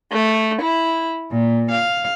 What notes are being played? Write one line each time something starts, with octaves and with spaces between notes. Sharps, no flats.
A3
E4
A#2
F5